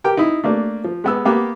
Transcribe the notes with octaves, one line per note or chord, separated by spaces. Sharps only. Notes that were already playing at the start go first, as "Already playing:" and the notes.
G4 A#4 G5
D#4 E4
A3 A#3 D4
F3
G#3 B3 E6
A#3 B3 G4